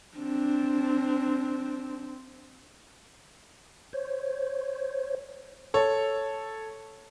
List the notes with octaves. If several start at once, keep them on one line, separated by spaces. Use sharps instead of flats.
C4 D4
C5 C#5
A4 C#5